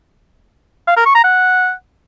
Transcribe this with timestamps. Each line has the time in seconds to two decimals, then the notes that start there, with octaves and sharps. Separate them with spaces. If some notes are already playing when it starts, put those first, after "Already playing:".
0.88 F5
0.97 A#4
1.06 C#6
1.15 A#5
1.24 F#5